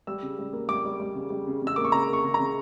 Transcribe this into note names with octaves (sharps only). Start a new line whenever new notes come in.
G3 E6
C#3
G3
A#3
G3 D6
G3
G3
C#3
G3
C#3
C#3
E6
A#3 D6
C#6
C#3 A#5
A#3 C#6
C#3
A#5
C#3